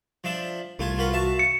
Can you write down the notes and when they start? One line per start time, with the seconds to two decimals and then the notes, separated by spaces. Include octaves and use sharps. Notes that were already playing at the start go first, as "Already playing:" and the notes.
0.24 F3 D4 E5
0.79 C2 A3 F4 G#5
0.98 F4 F#4 A#4 B4
1.13 F#4 E5 F5 A5
1.39 C#7